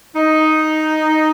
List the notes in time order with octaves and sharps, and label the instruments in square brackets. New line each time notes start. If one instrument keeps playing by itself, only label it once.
[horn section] D#4